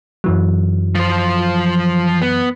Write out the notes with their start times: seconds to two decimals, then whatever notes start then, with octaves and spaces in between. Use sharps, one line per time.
0.24 F#2 E3 F#3
0.95 F3 C5
2.21 B3